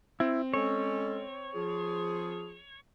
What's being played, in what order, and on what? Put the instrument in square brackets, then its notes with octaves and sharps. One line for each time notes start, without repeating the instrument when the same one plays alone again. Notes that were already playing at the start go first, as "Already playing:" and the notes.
[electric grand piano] C4 [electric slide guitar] E4
[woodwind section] G#3 C#4 A4 [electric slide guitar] C#5
[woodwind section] F3 F4 G#4